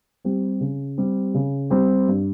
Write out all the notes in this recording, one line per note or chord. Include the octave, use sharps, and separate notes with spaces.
G3 C4 G4
C#3
G3 C4 G4
C#3
G3 C4 G4
G2